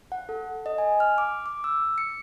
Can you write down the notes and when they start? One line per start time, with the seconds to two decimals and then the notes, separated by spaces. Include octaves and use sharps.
0.12 F#5
0.29 A4
0.66 D#5
0.78 G#5
1.00 F6
1.18 D6
1.46 D6
1.64 E6
1.98 C#7